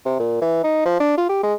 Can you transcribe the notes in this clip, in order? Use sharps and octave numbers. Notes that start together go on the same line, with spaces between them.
C3
A#2
E3
D#4
F3
D4
F4
G4
G#3